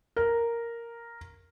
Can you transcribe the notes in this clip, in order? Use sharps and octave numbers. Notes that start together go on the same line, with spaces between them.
A#4